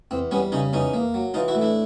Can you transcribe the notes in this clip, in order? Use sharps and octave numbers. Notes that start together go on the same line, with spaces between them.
E2 C4
G3 B3 C#4
C#3 C#4 D#4
E2 C#4 D#4
A#3
F#3
E3 D#4 F4
E4 F#4
A2
D4 E4